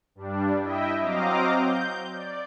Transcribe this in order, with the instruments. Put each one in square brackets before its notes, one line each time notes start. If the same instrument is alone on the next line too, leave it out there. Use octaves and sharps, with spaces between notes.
[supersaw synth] G2 G3 D4
E4 D#5 E5 G5
F#3 C4 D#5 F5 A#5 D6
G6
D5